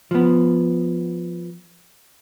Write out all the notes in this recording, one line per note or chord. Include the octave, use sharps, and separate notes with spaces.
F3 B3